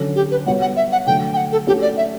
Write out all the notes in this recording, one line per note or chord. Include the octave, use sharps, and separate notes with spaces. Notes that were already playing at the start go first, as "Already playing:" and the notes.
Already playing: D3 F#3 C#4
G4
B4
G3 B3 F#4 C#5 F#5
F#5
E5
F#5
D3 F#3 A3 G5
G5
F#5
A4
A3 C#4 F#4 G4 A4 C#5
D5
E5